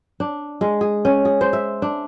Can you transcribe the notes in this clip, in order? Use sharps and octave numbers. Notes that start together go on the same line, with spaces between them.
D4
G#3
G#4
C#4
G#4
C5
E5
D4